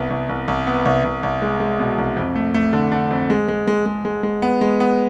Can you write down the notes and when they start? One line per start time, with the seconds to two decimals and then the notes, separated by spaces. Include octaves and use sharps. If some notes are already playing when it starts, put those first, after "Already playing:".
Already playing: C2 B3
0.10 C2
0.29 C2
0.48 C2
0.67 B3
0.85 C2
1.04 C2
1.23 C2
1.42 G#3
1.60 G#3
1.79 B2
1.98 C2
2.16 F2
2.35 A3
2.54 A3
2.73 D3
2.92 D3
3.10 F2
3.30 G#3
3.48 G#3
3.67 G#3
3.86 G#3
4.05 G#3
4.23 G#3
4.42 B3
4.61 G#3
4.80 B3